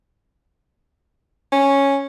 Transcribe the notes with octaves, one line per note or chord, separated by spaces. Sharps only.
C#4